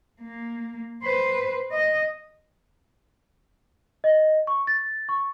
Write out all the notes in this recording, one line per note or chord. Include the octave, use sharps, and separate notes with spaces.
A#3
B4 C5
D#5
D#5
C#6
A6
C#6